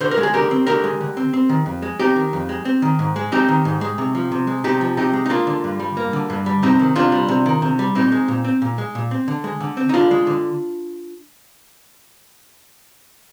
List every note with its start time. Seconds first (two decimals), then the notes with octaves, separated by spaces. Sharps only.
0.01 D3 C5
0.11 A#4
0.17 G#3
0.23 G#4
0.34 D3 G4 A#4
0.51 C4
0.67 D3 G4 A#4
0.84 G#3
1.00 D3
1.17 C4
1.33 C4
1.49 D#3
1.66 F2
1.82 G#3
2.00 C4 D#4 G4
2.16 D#3
2.33 F2
2.49 G#3
2.65 C4
2.82 D#3
2.99 G#2
3.16 G#3
3.32 C4 D#4 G4
3.48 D#3
3.65 G#2
3.81 G#3
3.98 C3
4.15 F3
4.32 C3
4.47 G#3
4.64 C3 D#4 G4
4.81 F3
4.97 C3 D#4 G4
5.13 G#3
5.26 D#4
5.30 A#3 D4 F4
5.47 D3
5.64 G2
5.80 G3
5.97 A#3
6.13 D3
6.30 G2
6.46 G3
6.62 C3 C4 D#4
6.79 D#3
6.95 C3 D4 F4
7.12 G3
7.28 C3
7.46 D#3
7.62 C3
7.79 G3
7.95 A#2 C4 D#4
8.12 G#3
8.28 A#2
8.45 C4
8.62 A#2
8.78 G#3
8.95 A#2
9.11 C4
9.28 D3
9.44 G#3
9.60 D3
9.77 C4
9.89 D#4
9.94 D3 D4 F4
10.11 G#3
10.27 D3